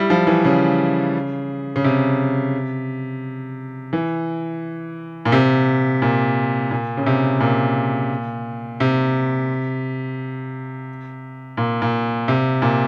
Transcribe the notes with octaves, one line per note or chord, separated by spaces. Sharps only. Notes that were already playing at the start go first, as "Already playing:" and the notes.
Already playing: G3 E4
F3
E3
C#3
C#3
C3
E3
A#2
C3
A#2
A#2
C#3
C3
A#2
C3
A#2
A#2
C3
A#2